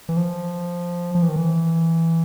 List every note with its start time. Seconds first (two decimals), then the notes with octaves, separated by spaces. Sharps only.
0.09 E3
0.17 F3
1.15 F3
1.22 E3
1.29 D#3
1.36 E3